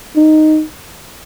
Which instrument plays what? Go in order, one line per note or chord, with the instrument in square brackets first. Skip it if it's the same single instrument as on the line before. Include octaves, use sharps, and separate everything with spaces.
[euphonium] D#4